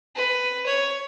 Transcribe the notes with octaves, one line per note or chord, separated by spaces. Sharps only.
B4
C#5